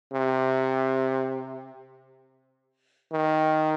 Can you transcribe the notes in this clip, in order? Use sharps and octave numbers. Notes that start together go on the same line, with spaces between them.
C3
D#3